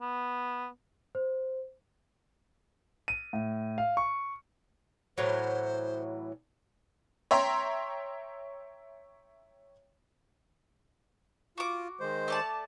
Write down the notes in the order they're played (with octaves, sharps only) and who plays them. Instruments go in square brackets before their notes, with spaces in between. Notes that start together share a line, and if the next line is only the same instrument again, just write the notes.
[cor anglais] B3
[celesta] C5
[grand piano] D#7
A2
F5
C#6
[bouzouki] A2 E3 F#3 [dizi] C5
[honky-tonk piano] C#5 E5 G5 A#5 C6
[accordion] F4 [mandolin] F#4 D6
[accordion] D#3 G#3 C5
[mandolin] A3 D5 A5